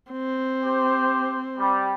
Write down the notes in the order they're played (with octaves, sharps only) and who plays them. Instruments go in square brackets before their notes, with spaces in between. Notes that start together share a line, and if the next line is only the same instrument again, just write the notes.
[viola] C4
[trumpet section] G4 C5
G3